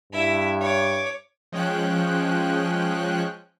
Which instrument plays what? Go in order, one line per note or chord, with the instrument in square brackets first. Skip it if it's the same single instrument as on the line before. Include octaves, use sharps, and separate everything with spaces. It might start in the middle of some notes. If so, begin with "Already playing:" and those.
[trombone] G2 [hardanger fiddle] E4 E5
[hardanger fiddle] C#5 D6
[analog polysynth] F3 G#3 C#4 G5 F#6